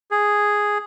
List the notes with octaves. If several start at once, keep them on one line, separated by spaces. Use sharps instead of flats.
G#4